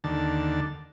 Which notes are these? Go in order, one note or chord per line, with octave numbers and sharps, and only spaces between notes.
D#2 D3 A5